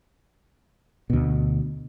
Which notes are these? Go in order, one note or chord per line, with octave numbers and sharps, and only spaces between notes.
D2 B2